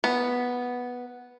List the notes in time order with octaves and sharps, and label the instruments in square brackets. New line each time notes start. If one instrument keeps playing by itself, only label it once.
[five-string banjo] B3